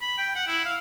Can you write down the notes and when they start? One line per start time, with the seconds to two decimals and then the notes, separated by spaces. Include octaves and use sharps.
0.02 B5
0.18 G5
0.35 F#5
0.47 E4
0.65 F5